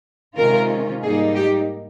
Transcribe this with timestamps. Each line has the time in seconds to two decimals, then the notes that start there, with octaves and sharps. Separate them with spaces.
0.37 C3 D#3 G#3 C#4 F4 A#4
1.02 G#2 G3 A#3 D#4 G#4
1.36 G4